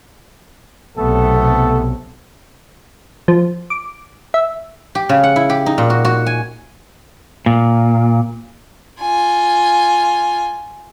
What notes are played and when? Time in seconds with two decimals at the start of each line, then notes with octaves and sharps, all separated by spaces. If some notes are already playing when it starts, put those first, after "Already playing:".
0.97 B1 C3 A3 B3 A4
3.28 F3
3.70 D6
4.34 E5
4.95 G4
5.09 C#3
5.24 F#5
5.36 E4
5.50 G4
5.66 D#4
5.78 A#2
5.90 F#4
6.05 F#4
6.26 G#5
7.46 A#2
9.01 F4 G#5